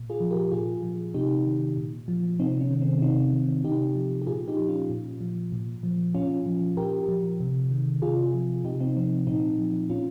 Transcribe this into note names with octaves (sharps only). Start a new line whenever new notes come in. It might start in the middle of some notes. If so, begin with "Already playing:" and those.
Already playing: A#2
F4 G#4
F3
G4 A#4
A#2 F4 G#4
F3
C3 D#4 G4
D#3
A#2
F3
C3 C4 D#4
C#4
D#3
C4
C3 C4 D#4
D#3
C3 D#4 G4
F3
G4
A#2 F4 G#4
D#4 G4
F3
C#4 F4
A#2
F3
A#2
F3
A#2 C#4 F4
F3
A#2 G4 A#4
F3
C3
D#3
C3 F4 G#4
F3
C3 D#4 G4
C4 D#4
F3 C4
A#2 C4 D#4
F3
A#2 C#4 F4